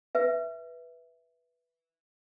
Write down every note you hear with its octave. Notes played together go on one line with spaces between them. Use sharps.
B4 E5